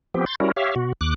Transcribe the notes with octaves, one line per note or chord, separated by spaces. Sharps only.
F3 B3 C4 G4
C6 G6 A6
G3 C#4 E4 F#4 A#4
G4 C#5 E5 F5
B2 F#4
D#2 D6 F#6